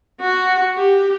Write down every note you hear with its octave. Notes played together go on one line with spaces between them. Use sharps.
F#4
G4